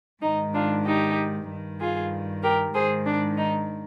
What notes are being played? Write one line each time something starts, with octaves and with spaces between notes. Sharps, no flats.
G#2 D#3 D#4
D4 F4
D#4 G4
G2 D#3
F4 G#4
G4 A#4
G#2 D#3 G#4 C5
D4
D#4